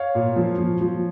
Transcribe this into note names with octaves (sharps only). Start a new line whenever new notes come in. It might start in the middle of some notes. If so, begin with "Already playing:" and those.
Already playing: C#5 F5
A#2
F3
F3
F3